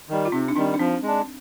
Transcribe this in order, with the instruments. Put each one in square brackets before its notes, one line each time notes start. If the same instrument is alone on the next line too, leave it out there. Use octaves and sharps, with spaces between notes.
[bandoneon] D#3 G3
[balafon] F4
[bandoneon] C3 [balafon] C4 D#4
[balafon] D4
[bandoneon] D#3 G3 [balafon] C4 D#4
[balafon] D4
[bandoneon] F3 [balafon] C4
[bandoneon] G#3 D4